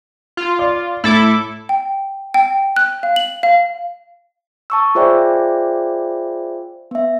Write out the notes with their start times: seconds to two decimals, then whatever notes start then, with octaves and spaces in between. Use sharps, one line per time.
0.37 F4
0.59 D5
1.04 A2 E4 A4 D6
1.69 G5
2.34 G5
2.76 F#6
3.03 F5
3.16 F#7
3.43 F5
4.70 A5 C#6 E6
4.95 F4 G#4 C5 D5 E5 G5
6.91 B3 E5